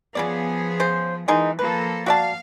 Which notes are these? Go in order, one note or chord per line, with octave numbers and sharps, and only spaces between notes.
C#3 F3 A#3 B3 G#4 D5
C#3 C5
D#3 E3 G#3 D#4
F3 A#3 A4 B4
F#4 D5 F5 A5